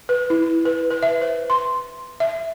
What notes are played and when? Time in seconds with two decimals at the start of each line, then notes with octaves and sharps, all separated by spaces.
0.09 B4
0.30 E4
0.65 B4
0.90 B4
1.03 E5
1.21 C5
1.50 C6
2.20 E5